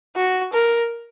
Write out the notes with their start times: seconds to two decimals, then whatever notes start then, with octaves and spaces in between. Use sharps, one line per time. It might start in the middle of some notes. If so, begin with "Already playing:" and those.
0.16 F#4
0.53 A#4